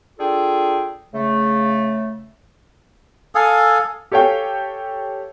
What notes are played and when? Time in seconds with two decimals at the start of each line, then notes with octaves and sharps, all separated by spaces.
0.19 D4 F4 G#4 A4 G5
1.13 C#3 A3
3.35 A4 F5 G#5 D#6
4.12 G4 A4 C#5 F5 G5 G#5